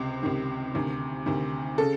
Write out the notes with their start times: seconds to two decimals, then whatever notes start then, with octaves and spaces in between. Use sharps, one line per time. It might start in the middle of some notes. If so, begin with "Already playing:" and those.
Already playing: C#2 C3
0.23 C#2 C3 D#3
0.75 D2 C3 D#3
1.26 D2 C3 D#3
1.78 C#3 A4